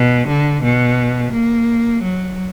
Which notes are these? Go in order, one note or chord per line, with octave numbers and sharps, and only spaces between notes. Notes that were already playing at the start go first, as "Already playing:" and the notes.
Already playing: B2
D3
B2
A#3
F#3